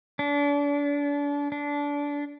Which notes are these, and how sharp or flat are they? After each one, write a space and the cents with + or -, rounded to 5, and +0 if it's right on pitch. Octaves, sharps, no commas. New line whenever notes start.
D4 -35
D4 -20